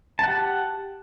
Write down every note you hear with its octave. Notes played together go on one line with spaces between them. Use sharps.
G4 F#5 A5